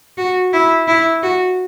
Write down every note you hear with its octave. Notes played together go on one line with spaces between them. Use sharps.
F#4
E4
E4
F#4